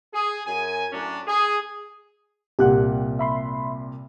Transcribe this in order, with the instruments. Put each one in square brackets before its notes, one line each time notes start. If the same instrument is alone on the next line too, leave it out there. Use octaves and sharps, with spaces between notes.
[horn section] G#4
F#2 G#5
A2 F#3 C#4 D4
G#4
[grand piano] C2 A#2 F#6 [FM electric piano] G4 F#5
[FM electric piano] E5 B5 C6